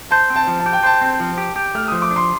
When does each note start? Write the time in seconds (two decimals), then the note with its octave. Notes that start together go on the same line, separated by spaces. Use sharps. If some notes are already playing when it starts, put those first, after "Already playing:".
0.11 C5 A5
0.30 C4
0.36 A5
0.47 F3
0.60 A5
0.66 G4
0.73 G5
0.83 C5 A5
1.02 C4
1.20 F3
1.38 G4
1.56 G4
1.75 A3 F6
1.88 F3 D#6
2.02 D6
2.11 D4
2.16 C6